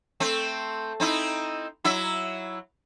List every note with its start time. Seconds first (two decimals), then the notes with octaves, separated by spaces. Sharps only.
0.20 A3 C4
1.00 C4 D#4 E4
1.84 F#3 E4 E5